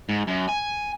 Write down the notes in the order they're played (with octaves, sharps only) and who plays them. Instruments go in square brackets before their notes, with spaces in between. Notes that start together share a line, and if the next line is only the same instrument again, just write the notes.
[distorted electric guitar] G#2
F#2
G#5